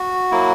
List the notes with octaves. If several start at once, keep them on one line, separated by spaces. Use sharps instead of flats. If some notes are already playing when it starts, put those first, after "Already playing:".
Already playing: F#4
F#3 A#3 E4